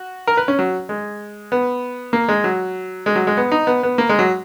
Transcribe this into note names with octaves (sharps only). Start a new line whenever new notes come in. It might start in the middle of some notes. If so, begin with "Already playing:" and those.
Already playing: F#4
A#4
B4
C#4
F#3
G#3
B3
A#3
G#3
F#3
G#3
F#3
G#3
B3
D#4
B3
B3
A#3
G#3
F#3